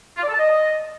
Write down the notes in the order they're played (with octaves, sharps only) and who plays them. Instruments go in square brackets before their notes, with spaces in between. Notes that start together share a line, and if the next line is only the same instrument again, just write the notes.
[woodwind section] F4
D5
A4
A5
D#5